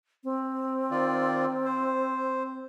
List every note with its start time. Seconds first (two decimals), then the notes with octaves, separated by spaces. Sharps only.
0.24 C4
0.91 D#3 F4 D5
1.65 C5